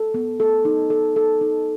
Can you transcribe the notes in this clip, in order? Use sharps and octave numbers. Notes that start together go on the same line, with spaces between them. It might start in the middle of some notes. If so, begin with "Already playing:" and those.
Already playing: A4
B3
A4
D#4
A4
A4
D#4